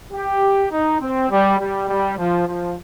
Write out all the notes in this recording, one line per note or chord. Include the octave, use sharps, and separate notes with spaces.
G4
D#4
C4
G3
G3
G3
F3
F3